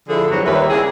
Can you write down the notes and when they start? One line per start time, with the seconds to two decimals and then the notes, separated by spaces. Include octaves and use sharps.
0.09 D3 F3 E4 G#4 A4
0.31 E2 G2 F3 F#3
0.46 D#2 D#3 G3 B4 C#5 E5
0.70 C#3 A#3 C4 E4 G#4